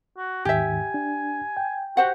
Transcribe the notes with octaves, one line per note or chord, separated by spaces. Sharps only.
F#4
D#2 G#2 D#3 G4 E5 G#5
D4
G5
F#4 G4 C5 F#5